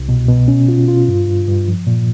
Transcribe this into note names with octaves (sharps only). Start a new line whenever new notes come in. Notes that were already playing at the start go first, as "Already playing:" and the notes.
Already playing: C2
B2
B2
C#4
F4
F4
G2
G2
G2
F3
A#2